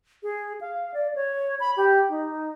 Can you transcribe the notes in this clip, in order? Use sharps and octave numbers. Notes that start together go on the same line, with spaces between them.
G#4
F5
D5
C#5
B5
G4
D#4